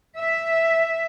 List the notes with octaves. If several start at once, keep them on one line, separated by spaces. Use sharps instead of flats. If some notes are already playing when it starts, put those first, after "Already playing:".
E5